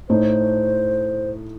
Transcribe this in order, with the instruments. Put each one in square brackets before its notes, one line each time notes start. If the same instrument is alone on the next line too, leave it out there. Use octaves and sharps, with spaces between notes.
[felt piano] A2 A3 D#4 [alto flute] C5